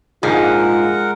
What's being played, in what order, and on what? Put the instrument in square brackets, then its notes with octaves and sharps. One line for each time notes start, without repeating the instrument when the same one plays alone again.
[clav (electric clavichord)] A#1 G#2 [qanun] G#3 [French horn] F4 [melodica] A#4 F#5